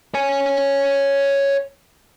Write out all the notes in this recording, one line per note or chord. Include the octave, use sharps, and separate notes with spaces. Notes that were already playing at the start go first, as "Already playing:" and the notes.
C#5 G#5